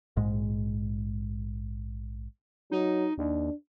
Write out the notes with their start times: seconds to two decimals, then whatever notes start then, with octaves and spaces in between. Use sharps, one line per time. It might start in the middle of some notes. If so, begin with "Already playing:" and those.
0.16 A#1 G#2 G#3
2.71 F#3 D#4
3.18 D#2 D4